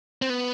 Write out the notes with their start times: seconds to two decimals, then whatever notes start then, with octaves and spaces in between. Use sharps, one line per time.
0.22 C4
0.30 B3